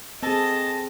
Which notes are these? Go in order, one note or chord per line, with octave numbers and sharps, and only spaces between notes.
C4 G#4 A4 D#5 A5